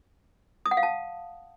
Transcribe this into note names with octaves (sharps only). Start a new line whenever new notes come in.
D#6
F#5
F5
A5